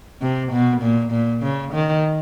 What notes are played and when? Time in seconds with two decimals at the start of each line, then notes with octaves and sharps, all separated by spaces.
0.21 C3
0.52 B2
0.81 A#2
1.11 A#2
1.43 C#3
1.73 D#3